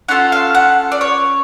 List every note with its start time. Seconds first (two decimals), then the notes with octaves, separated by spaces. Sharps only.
0.08 C#4 F4 A4 F#5
0.32 F5
0.55 F#5
0.92 D5
1.01 C#5